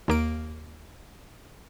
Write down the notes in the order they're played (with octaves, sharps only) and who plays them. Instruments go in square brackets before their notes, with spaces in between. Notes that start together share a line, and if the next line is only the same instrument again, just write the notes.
[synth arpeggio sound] D#2 A#3 D7